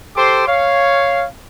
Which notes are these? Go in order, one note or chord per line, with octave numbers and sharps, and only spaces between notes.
G4 A4 C5 C6 D6
C#5 F5